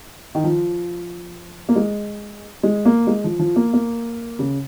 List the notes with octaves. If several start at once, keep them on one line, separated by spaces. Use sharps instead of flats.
D#3
F3
A#3
G#3
G#3
A#3
G#3
F3
F3
A#3
A#3
C#3